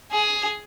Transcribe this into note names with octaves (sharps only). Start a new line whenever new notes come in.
G#4